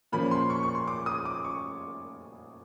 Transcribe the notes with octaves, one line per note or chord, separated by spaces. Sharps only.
A#2 F3 A#3 C#4 B5
C6
C#6
C#6
C6
D6
D#6
D6
C#6